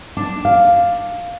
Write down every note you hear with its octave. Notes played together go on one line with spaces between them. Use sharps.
D4
F5